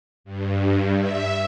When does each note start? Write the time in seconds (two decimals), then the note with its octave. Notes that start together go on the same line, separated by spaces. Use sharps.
0.24 G2
0.99 E5